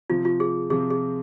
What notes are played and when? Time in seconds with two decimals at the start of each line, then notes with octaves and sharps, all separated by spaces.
0.10 C3 F3 C4 F4
0.25 F4
0.40 G#4
0.70 C3 F3 C4 G#4
0.90 G#4